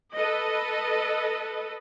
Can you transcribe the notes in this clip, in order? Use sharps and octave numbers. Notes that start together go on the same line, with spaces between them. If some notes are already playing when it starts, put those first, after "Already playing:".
A4 B4 D#5